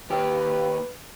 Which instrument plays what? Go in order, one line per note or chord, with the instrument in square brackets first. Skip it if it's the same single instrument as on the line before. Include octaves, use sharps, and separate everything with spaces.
[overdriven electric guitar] D#2 G4 [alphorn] B4